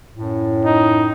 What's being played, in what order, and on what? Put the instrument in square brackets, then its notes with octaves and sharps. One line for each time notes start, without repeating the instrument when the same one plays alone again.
[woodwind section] F#2 A2
[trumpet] D#4